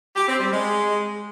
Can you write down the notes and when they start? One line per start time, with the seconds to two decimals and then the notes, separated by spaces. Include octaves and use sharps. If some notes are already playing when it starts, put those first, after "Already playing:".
0.16 G4
0.28 C4
0.40 G3
0.52 G#3